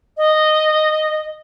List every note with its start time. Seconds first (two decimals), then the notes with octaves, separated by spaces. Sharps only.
0.17 D#5